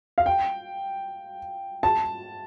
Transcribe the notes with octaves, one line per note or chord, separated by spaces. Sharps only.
F5
G5
A5